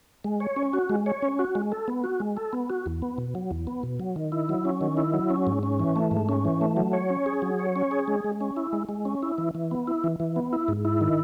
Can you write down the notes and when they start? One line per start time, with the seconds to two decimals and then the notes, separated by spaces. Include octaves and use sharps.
0.24 G#3
0.40 C#5
0.56 C#4
0.73 F#4
0.90 G#3
1.06 C#5
1.22 C#4
1.39 F#4
1.55 G#3
1.72 A4
1.88 B3
2.04 F#4
2.20 G#3
2.37 A4
2.53 B3
2.70 F#4
2.86 E2
3.02 B3
3.18 B2
3.35 F#3
3.51 E2
3.67 B3
3.83 B2
4.00 F#3
4.16 D#3
4.32 E4
4.49 F#3
4.65 C#4
4.81 D#3
4.97 E4
5.14 F#3
5.30 C#4
5.47 G#2
5.63 C#4
5.80 E3
5.96 A3
6.11 G#2
6.29 C#4
6.45 E3
6.61 A3
6.77 F#3
6.93 C#5
7.10 C#4
7.26 G#4
7.42 F#3
7.59 C#5
7.76 C#4
7.91 G#4
8.08 G#3
8.24 G#3
8.41 C#4
8.57 E4
8.73 G#3
8.89 G#3
9.05 C#4
9.23 E4
9.38 E3
9.55 E3
9.71 B3
9.87 E4
10.04 E3
10.20 E3
10.36 B3
10.53 E4
10.68 G#2
10.85 E4
11.01 D#3